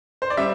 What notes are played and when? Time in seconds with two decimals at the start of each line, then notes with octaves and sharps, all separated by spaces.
0.22 C5
0.30 D5
0.37 G3 E5